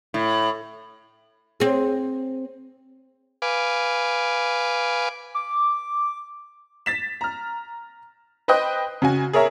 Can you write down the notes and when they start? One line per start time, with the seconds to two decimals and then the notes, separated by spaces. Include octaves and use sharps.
0.14 A2
1.60 C4 G#4
3.42 B4 F5 G#5 D6
5.35 D6
6.86 A6 B6 E7
7.21 A#5 F6
8.48 B4 C5 D#5 G5 D#6 F#6
9.02 C#3 F#4 G#5
9.33 G#4 A#4 C#5 E5 A#5